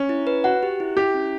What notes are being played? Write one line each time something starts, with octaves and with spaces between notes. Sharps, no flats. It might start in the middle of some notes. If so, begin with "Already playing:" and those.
Already playing: C#4
E4
B4
F#4 F#5
G4
E4
E4 G4
C#4